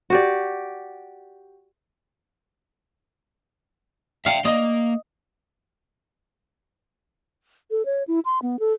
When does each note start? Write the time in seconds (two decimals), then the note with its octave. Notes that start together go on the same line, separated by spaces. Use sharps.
0.10 F#4 G4 D5
4.26 E5 F5 G5
4.45 A#3 D#5
7.71 A4
7.86 C#5
8.08 E4
8.25 C6
8.42 B3
8.60 A4